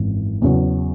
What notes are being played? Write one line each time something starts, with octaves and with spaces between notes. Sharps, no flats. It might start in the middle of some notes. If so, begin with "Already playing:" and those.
Already playing: G#1 F#2 E3
E2 C#3 F#3